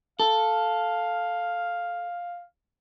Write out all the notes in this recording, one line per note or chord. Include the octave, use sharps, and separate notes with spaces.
A4 F5